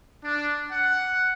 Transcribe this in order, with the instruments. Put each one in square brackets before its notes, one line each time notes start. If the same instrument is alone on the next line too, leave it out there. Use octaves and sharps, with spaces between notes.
[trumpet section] D4
F#5